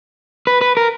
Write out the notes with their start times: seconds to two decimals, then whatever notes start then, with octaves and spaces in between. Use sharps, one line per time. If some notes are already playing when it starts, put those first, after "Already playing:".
0.47 B4
0.61 B4
0.77 A#4